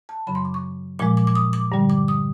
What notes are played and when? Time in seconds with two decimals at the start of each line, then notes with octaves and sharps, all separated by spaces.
0.09 A5
0.27 F#2 C#3 F#3 B5
0.35 C6
0.45 D6
0.54 C#6
0.99 A#2 F3 G#3 D6
1.17 D6
1.27 D6
1.35 D#6
1.53 D6
1.72 G2 D3 G3
1.90 D6
2.08 D#6